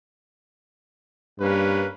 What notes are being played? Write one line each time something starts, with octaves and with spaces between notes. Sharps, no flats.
G2 A#3 C#4 B4